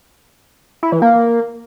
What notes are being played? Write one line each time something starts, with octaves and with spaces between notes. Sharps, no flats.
E4
E3
A#3